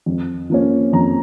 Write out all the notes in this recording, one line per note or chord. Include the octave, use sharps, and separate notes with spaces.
F2
F3 A#3 C#4
F2 A#5